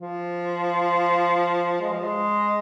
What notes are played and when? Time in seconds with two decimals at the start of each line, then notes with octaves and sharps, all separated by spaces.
0.01 F3
1.81 G#3
1.92 F3
2.04 G#3